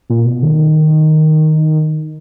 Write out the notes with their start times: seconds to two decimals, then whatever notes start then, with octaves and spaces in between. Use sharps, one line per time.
0.10 A#2
0.25 B2
0.43 D#3